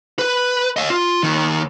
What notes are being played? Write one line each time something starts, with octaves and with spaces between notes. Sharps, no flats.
B4
D#5 F5
F4
D#2 D#3